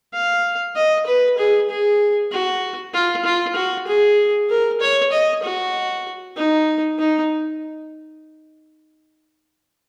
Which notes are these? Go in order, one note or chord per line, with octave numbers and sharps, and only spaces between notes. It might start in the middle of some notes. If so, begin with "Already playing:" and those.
F5
D#5
B4
G#4
G#4
F#4
F4
F4
F#4
G#4
A#4
C#5
D#5
F#4
D#4
D#4